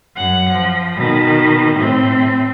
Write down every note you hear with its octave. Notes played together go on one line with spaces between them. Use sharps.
F#2 F#5
F3
B2 D#3
A2 C4